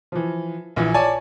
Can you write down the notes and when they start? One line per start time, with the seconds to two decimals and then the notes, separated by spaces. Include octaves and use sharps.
0.12 E3 F3
0.76 A#1 E3 E4
0.94 C#5 D5 G#5 A5